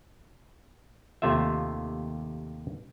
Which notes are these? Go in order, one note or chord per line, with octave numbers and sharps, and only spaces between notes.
D#2 C3 A3 F4 E5